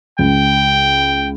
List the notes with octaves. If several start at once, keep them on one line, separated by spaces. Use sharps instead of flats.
C#2 G5